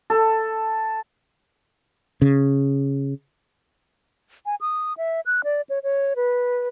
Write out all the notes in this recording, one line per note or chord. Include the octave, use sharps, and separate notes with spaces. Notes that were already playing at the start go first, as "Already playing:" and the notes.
A4
C#3
G#5
D#6
E5
F#6
D5
C#5
C#5
B4